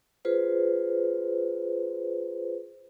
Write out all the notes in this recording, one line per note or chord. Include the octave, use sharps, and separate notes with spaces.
F4 G#4 B4 C5